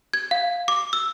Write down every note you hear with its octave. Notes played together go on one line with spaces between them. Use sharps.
G#6
F5
D6
E6